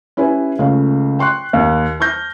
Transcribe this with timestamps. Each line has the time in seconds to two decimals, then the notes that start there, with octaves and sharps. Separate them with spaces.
0.17 C#4 E4 G4 B4 G#5
0.59 C#2 A3 C#4 F5
1.19 G5 C6 C#6 F#6
1.53 D#2
2.00 A5 C#6 F6 G6 A#6